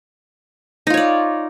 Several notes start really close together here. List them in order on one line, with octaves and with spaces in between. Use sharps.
D#4 F4 C#5 D5